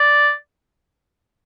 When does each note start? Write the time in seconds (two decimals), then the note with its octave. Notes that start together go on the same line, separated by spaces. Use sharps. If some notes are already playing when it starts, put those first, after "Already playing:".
Already playing: D5